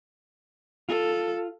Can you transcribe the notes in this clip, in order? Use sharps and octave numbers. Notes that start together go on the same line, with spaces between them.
F4 A4